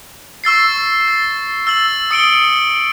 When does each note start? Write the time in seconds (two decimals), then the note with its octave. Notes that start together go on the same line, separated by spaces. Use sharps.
0.44 C#6 E6 A6 C7
1.08 A6
1.67 E6 A6 F#7
2.11 D#6 C#7 D7 G7